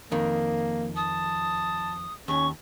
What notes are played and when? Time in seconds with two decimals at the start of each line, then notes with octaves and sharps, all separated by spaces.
0.12 F2 D#3 A#3
0.96 A5 D#6
2.28 D#2 C#4 C#6